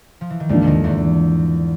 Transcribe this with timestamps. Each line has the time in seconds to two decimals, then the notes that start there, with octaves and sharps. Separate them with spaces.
0.21 F3
0.30 E3
0.40 D#3
0.49 D2 G#2 D3 F3 A#3 D4
0.62 D#2 D3 D#3
0.84 E2 E3